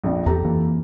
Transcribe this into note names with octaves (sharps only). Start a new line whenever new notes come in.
A#1 F2
E2 G4 A4 A#5
F2 E3 A#3